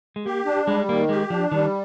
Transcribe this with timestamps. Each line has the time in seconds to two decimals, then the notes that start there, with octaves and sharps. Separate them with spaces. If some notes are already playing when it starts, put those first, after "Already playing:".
0.16 G#3
0.26 A#3 G4
0.46 D4
0.67 G3 G#3
0.88 D#3 A#3
1.09 G#3 G4
1.30 F3 D4
1.52 D#3 G3